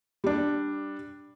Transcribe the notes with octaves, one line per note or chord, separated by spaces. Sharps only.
G3 D4